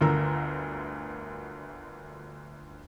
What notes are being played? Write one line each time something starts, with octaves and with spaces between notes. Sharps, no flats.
G1 D2 D3 A#4 A#5 E6